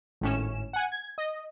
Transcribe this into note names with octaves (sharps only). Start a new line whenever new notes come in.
G#1 A2 C#4 E7
F#5 G#5
G#6
D#5